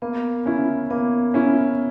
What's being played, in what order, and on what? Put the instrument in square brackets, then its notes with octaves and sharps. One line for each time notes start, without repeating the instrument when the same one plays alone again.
[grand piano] A#3 [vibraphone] B3
[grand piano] C#4 E4
[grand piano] A#3 [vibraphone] B3
[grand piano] C#4 E4